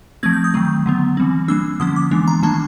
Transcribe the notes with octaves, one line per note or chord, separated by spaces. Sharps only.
F3 A3 C4 G#6
G6
D#6
D#3 F#3 A3
D3 F#3 B3
E3 G3 C4
G3 A#3 D4 E6
D3 F3 A#3 C#4 D#6
D6
E3 G#3 B3 D4
A#5
D#3 G3 A#3 D4 A5